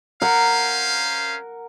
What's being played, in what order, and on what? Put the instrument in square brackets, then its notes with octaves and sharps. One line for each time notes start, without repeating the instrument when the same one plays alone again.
[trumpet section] C#4 C5 F5 [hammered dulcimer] A#4 F#5